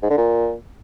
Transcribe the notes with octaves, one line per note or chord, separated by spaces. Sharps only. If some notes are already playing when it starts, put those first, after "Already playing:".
G#2
D3
A#2